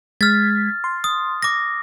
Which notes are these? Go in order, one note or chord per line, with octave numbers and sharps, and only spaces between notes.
G#3 F6 G#6 A6 B6
C6
D#6
D6 A#6